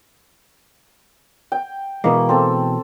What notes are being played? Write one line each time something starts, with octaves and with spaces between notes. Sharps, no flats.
G5
B2 E3 G#3 A#3
C4 A4